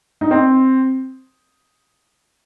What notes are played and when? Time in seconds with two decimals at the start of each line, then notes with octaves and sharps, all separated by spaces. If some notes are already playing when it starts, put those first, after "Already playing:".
0.21 D#4
0.31 C4